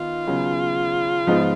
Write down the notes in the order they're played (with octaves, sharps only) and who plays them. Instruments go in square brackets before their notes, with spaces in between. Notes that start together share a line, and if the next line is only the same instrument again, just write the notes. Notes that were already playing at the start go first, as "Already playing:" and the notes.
Already playing: [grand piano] D#3 B3 D#4 [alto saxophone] F4
[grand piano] C#3 F#3 B3
G#2 F3 B3 D#4